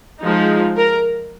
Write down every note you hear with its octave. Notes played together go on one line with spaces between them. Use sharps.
F3 G#3 D#4
A#4